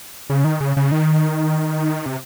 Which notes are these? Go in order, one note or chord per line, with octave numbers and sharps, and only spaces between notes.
C#3
D#3
C#3
C#3
D#3
C3